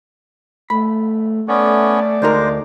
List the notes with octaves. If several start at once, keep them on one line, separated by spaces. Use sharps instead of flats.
A3 B5
A3 B3 C#4 D5
D2 G#3 D#4 A#4 C5